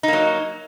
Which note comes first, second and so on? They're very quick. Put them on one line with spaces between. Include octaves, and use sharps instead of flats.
D#4 A#3 F#3